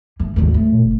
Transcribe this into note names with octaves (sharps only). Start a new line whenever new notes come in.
E3
G#1 D#2 D3
A3
A#2
F#1